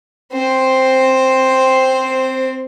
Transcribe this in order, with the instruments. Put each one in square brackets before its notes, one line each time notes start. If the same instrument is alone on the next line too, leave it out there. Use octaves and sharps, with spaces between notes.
[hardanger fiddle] C4 C5